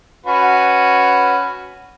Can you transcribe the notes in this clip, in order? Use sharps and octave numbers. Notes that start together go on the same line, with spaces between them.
C#4 F#4 B4